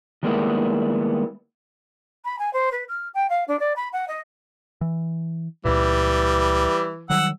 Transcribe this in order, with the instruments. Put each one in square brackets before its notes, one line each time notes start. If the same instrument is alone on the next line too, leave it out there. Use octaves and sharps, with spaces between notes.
[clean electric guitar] D#3 G3 G#3 A#3 B3 E4
[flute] B5
G#5
C5
B4
F6
G5
F5
D4
D5
B5
F#5
D#5
[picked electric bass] E3
[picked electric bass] C#2 A#2 [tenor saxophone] E3 [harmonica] G3
[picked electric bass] D#3 F#3 G3 [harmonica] F#5 E6